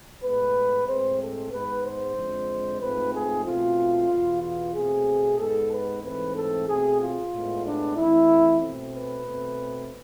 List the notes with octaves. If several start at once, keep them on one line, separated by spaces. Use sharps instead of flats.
A2 G#3 B3 B4
A2 G#3 C4 C5
A4
G#2 G#3 B3 B4
C5
F2 D3 F3 G#3
G#2 F3 A3 C4 B4
G#4
B2 A3 C4 F4
E2 B2 B3
F4
B2 A3 C4 G#4
G#2 G#3 B3 A4
B4
G#2 E3 A3 C4 B4
A4
B2 A3 C4 G#4
F4
A2 G#3 B3
D4
F2 E3 A3 E4
B2 A3 C4
B4
B2 A3 C4